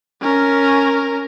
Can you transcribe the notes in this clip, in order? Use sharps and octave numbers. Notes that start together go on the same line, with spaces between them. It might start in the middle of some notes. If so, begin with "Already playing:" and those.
C#4 A#4